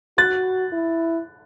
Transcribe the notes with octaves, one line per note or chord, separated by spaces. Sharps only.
F#4 F#6 A6
E4